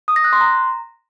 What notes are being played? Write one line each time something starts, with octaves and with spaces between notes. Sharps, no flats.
D#6
A#6
F#6
C6
A#5